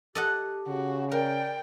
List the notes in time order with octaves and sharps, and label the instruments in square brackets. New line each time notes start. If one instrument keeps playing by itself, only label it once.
[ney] G4 [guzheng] A4 D#5 F#5
[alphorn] C#3 [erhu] F#4
[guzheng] A#4 [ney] D5 [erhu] G5